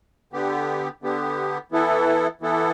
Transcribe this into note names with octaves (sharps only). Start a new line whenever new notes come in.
D3 B3 G4
D3 B3 G4
E3 B3 E4 A4
E3 B3 E4 A4